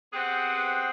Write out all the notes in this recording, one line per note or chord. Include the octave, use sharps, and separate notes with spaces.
B3 C4 G4 G#4 B4 F#5